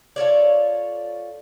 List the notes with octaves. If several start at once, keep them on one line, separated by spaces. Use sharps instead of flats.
F4 A4 C#5 D5